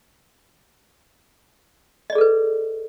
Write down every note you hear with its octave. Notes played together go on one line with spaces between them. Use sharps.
G#4 A4 B4 D5 D#5